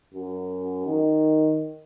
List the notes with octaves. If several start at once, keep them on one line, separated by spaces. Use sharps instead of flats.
F#2
D#3